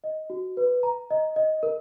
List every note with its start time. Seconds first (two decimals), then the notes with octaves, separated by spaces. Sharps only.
0.04 D#5
0.30 F#4
0.57 B4
0.83 A#5
1.11 D#5
1.36 D#5
1.63 A#4